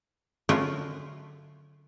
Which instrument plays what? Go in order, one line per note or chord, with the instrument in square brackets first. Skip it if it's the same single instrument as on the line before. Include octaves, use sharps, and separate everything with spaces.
[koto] D3 F#3 A3 C#4 F4 A#4